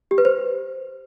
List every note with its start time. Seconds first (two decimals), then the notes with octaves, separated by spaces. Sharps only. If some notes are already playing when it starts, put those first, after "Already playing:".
0.11 G4
0.18 B4
0.25 C5